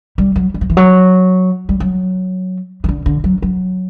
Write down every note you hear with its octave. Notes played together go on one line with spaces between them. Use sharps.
G3
F#3
G3
F#3
E3
F#3
G3
F#3
E3
D3
D3
F#3
F#3